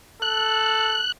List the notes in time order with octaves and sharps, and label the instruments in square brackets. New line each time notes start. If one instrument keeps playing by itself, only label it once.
[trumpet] A4 [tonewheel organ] F#6